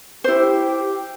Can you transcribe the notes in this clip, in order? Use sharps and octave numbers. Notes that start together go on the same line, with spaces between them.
E4 G4 C5